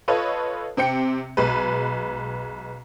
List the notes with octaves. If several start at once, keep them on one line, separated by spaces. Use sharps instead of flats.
F4 A4 B4 C#5 D#5
C3 C4 G5 C#7
B1 G#3 B4